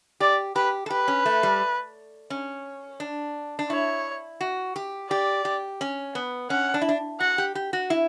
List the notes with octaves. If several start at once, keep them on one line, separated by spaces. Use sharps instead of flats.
G4 D5
G4 B4
A4
G4 B4
C#4
A3
G3
C#4
D4
D4
E4 C#5
F#4
G4
G4 D5
G4
C#4
B3
C#4 F#5
D4
E4
D4
F#4 F#5
G4
G4
F#4
E4